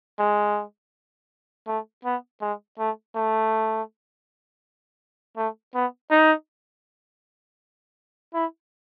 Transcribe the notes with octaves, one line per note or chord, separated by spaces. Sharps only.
G#3
A3
B3
G#3
A3
A3
A3
B3
D#4
E4